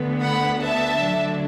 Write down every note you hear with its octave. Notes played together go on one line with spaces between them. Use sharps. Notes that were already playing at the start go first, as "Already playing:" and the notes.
Already playing: D2 D3 B3
F#5 B5
E5 A5
D2 D3 F#3 D4